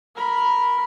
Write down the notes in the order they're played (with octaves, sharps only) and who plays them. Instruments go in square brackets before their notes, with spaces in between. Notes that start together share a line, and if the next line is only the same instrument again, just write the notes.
[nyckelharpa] A#4 B5